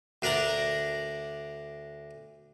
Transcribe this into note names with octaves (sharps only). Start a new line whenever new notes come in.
D2 D4 A#4 D5 A#5